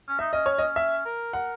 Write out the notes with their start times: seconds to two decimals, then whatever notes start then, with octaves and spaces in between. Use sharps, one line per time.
0.08 C#4
0.19 D#4 E5
0.33 C#4 D#5
0.46 C#5
0.58 D#5
0.76 E5
1.05 A#4
1.33 A#4 F#5